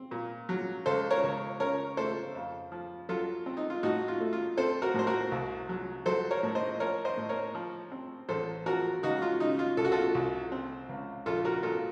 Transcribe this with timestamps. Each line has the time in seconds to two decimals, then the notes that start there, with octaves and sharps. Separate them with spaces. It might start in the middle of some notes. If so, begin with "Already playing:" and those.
Already playing: C4
0.11 A#2
0.49 F#3
0.86 C#2 A4 C5
1.11 A#4 C#5
1.23 C#2
1.60 C#3 A#4 C#5
1.97 A3 A4 C5
2.35 F2
2.72 F3
3.09 F#3 F4 A4
3.46 C4
3.57 D#4
3.70 F4
3.83 A2 D#4 F#4
4.08 F4
4.20 A3
4.33 F4
4.57 C4 A4 C5
4.82 F#4 A#4
4.94 A2 C5
5.07 F#4 A#4
5.32 C2
5.69 F#3
6.06 F#3 A4 C5
6.31 A#4 C#5
6.43 A2
6.55 C5 D#5
6.80 F3 A#4 C#5
7.05 C5 D#5
7.17 A2
7.29 A#4 C#5
7.55 F3
7.92 C4
8.29 A1 A4 C5
8.66 F3 F#4 A#4
9.03 C#2 D#4 F#4
9.22 F4
9.40 C#3 D#4
9.59 F4
9.77 C2 A4
9.85 F#4
9.92 F4 A4
10.15 C2
10.52 C4
10.89 C#2
11.26 A#1 F4 A4
11.45 F#4 A#4
11.63 A#2 F4 A4